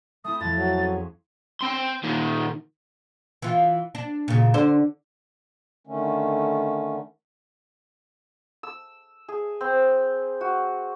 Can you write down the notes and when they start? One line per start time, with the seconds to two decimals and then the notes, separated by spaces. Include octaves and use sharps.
0.24 A3 C4 E4 D#6
0.41 F2 F3 A6
0.57 F#3
0.78 C#4 G#4
1.61 C4 C6
2.04 A#2 D#3
3.42 E3 F4
3.95 D4
4.28 A#2 C#3
4.54 D3 C5
5.87 D3 D#3 A3 C#4
8.63 E6
9.28 G#4
9.61 C4
10.41 F#4